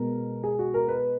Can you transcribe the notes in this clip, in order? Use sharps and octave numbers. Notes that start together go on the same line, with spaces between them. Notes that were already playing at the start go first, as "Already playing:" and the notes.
Already playing: B2 G#3 B3 A#4
G#4
F#4
A#4
B4